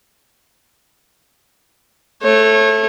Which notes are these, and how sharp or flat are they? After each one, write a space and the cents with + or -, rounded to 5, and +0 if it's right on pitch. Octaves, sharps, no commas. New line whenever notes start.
A3 +0 C#5 -30